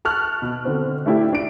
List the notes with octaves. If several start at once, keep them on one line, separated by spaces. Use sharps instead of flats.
A5 C#6 F6 F#6
B2
D3 C4
A3 D4 E4 G4
D4 D7